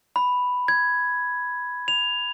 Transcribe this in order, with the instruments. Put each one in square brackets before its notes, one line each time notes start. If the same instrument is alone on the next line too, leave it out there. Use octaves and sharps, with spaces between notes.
[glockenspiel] B5
G#6
F7